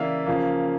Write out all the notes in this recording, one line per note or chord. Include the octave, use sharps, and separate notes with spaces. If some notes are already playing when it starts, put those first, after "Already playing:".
Already playing: C#3 E3 A#3 D5 E5 F5
C#3 F3 A#3